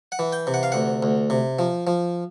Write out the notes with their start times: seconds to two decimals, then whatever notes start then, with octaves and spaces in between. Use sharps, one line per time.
0.12 F#5
0.19 E3
0.33 G5
0.47 C3
0.54 F#5
0.63 F5
0.72 D2 F#5
1.03 D2
1.30 C3
1.59 F3
1.87 F3